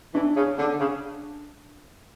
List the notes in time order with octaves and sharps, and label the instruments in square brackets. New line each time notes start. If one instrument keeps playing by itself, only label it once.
[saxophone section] E3 [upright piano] D4
[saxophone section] C#3
[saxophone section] D3 [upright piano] D4
[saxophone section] C#3